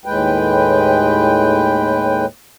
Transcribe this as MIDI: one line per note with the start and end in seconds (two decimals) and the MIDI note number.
0.06 2.26 39
0.06 2.26 45
0.06 2.26 56
0.06 2.26 71
0.06 2.26 79